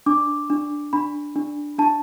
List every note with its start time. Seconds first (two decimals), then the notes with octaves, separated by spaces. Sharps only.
0.06 D4 D6
0.50 D4
0.93 D4 B5
1.36 D4
1.78 D4 A5